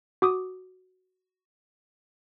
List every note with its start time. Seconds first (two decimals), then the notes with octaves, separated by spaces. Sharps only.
0.22 F#4 D6 D#6